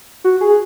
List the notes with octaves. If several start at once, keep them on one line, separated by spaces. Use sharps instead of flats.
F#4
G#4